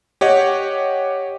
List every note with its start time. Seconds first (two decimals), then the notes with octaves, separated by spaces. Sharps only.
0.21 G4 C#5 D#5 F#5